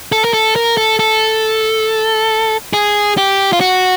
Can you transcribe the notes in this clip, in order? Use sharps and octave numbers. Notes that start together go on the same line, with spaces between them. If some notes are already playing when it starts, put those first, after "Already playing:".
A4
A#4
A4
A#4
A4
A4
G#4
G4
F4
F#4